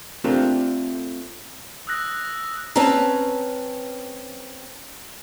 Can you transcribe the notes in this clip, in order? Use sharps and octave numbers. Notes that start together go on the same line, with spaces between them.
A3 C4 D4 F4 G4 A#4
D#6 E6 F#6 A#6
C4 C#4 B4 A5 A#5